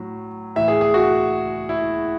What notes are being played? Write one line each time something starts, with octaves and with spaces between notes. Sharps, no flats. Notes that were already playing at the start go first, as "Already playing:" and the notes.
Already playing: A2 F#3
A2 E3 E5
G#4
G#4
F#4
E4